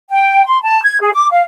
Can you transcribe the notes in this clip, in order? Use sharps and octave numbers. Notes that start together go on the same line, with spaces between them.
G5
C6
A5
G#6
G#4
D6
F5